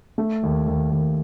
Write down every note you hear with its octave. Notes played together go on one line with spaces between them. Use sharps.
A3
D#2
D#2
D#2